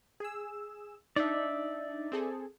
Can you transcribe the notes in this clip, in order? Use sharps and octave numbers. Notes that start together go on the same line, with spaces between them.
G#4 E6
D4 D#4 D5 E5
C4 G#4 A4